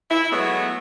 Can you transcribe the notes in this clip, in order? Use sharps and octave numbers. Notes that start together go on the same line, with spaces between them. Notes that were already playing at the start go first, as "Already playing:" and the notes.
E4
F#3 G#3 A3 B3